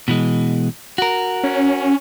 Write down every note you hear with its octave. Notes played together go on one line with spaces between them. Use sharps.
B2 E3 G#3
F#4 A#4
C#4